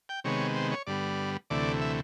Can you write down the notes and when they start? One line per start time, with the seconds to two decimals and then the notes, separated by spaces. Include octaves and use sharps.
0.09 G5
0.24 C3 D#3 G#3 B3 C#5
0.56 C5
0.71 C#5
0.87 G2 D3 G3 B3 D5
1.50 D2 C3 E3 A3 D5
1.81 E5